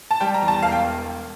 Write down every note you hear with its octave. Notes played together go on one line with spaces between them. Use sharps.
A5
G3 G5
A#5
E2
A5
E1 F5
G5